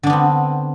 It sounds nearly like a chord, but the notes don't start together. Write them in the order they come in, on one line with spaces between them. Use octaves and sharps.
D3 D4 B3 C4